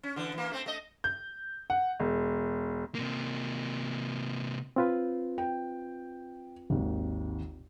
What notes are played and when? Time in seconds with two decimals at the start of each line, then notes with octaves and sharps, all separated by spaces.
0.03 C#4
0.16 D3 E3
0.34 E3 A#3
0.52 A3 C4
0.66 A3 D#5
1.04 G6
1.70 F#5
2.00 E1
2.95 C3 A#3
4.76 C4 F4 B4
5.38 G5
6.70 G#1 D#2